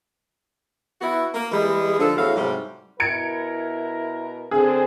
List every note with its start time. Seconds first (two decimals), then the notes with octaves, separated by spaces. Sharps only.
1.01 B3 E4 F#4
1.34 A#3
1.52 E3 G3 G#3
1.99 D3 F3 D4 A4
2.16 E2 A2 F#4 F5
2.36 G#2 C3 F#3 G3
3.00 B2 E4 A#4 G#6 C#7 D7
4.51 D3 C4 G#4